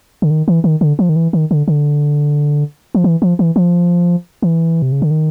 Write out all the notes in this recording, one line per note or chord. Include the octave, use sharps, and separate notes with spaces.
D3
D#3
E3
D#3
D3
F3
D#3
E3
D#3
D3
D3
F3
E3
F3
E3
F3
E3
C3
C#3
D3
D#3